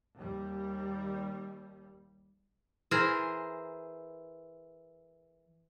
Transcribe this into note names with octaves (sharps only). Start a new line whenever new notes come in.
D#2 G3
E3 G#4 A#4 C5